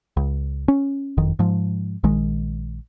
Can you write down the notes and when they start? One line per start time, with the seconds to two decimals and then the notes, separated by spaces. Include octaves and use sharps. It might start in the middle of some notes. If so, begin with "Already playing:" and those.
0.17 C#2
0.68 C#4
1.17 F#1 F2 D#3
1.39 G#2 F3
2.04 A#1 D#3 G#3